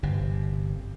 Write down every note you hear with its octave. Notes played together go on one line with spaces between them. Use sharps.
G1 C3